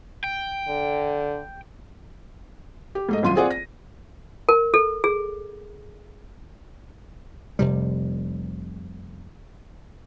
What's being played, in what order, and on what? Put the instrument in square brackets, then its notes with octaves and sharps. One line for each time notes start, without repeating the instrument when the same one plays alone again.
[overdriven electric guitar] G5
[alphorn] D3
[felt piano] G4
G#2 A3 D#5
D#1 C2 F#2 F4 C6 D#7
C4 F4 G#4 D5 F#5
A#6
[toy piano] A#4
A4
G#4
[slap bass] F1 C3 G3